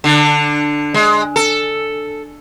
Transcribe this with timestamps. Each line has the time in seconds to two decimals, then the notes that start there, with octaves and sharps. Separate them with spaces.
0.04 D3 D4
0.94 G#3
1.36 A4